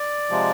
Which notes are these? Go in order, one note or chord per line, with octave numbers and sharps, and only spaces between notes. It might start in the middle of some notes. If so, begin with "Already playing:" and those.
Already playing: D5
C3 F3 G#3